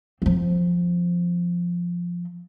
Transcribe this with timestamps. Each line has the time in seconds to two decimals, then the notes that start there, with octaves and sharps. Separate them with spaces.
0.22 F3 C4